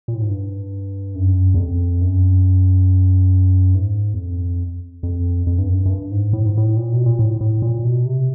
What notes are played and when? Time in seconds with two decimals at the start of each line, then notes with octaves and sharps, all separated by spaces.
0.08 A#2
0.14 A2
0.22 G#2
0.29 G2
1.15 F#2
1.54 E2
1.58 F2
2.02 F#2
3.75 G#2
4.14 E2
4.18 F2
5.03 F2
5.47 F2
5.58 G2
5.69 F#2
5.85 F#2
5.89 G2
6.11 G#2
6.33 A2
6.46 G#2
6.57 A2
6.77 A#2
6.93 B2
7.06 A#2
7.19 A2
7.41 A2
7.62 A#2
7.84 B2
8.06 C3